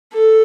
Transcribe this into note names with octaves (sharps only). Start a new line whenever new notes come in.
A4